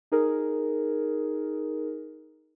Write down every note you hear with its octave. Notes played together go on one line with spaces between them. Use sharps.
D#4 G#4 A#4